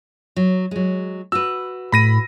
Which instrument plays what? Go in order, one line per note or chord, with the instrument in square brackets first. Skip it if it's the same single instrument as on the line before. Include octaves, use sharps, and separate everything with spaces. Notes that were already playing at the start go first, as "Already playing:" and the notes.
[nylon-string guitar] F#3
F#3 G#3
[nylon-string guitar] F#4 B4 [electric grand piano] E6
[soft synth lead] A2 [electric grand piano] B5 A#6 D#7